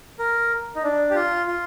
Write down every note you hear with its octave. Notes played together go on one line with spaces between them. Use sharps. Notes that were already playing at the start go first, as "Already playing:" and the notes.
A#4
D#4
D4
G4
F4
F4